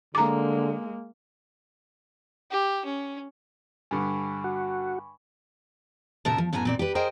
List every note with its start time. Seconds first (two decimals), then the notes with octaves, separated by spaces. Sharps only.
0.15 D3 G#3 A#3 A#5 D6
2.51 G4
2.85 C#4
3.91 G2 D3 G#5 B5 C#6
4.44 F#4
6.25 A#2 C#3 A#4 C#5 E5 A5
6.38 F3
6.53 F#2 A2 B3 G#5 A#5
6.65 A#2 C4 D5
6.79 G4 B4
6.95 G#4 A#4 C5 D#5 G5 G#5